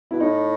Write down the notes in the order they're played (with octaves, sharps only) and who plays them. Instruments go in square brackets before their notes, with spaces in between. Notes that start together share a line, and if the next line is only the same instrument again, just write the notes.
[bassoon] B2 [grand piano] E4
[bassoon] A2 [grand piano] D#4